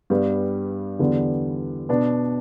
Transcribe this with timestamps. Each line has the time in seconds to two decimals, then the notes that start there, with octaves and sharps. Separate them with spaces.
0.10 G2 G3 B3
0.99 E2 D3 G3 B3
1.89 B2 B3 D4